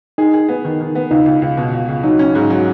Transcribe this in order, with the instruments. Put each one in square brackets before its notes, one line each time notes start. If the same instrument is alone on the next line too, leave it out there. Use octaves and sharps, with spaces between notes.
[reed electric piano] D#4 [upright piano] G#4
[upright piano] G#4
B3
D#3
D#3
B3
[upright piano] C#2 [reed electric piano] D#4
[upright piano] C#2
C#2
B2
C#2
C#2
[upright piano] F#3 [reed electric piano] D#4
[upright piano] C#4
G#2
F#3